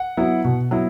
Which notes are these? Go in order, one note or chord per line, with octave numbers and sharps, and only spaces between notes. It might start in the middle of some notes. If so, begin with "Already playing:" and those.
Already playing: F#5
F#3 B3 E4
B2
F#3 B3 E4